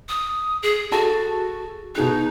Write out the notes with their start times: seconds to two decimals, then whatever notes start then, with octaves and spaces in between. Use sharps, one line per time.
0.09 D#6
0.63 G#4
0.92 F#4 G#4 A4 A5
1.95 B2 D#4 G#4 F#6